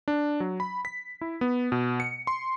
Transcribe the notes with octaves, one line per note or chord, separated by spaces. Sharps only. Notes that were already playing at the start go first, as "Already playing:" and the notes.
D4
F#3
B5
B6
E4
B3
B2
C#7
C6